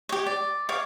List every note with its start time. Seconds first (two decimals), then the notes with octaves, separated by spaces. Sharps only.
0.09 G4 C#5
0.26 D5
0.69 C#5 F5 D6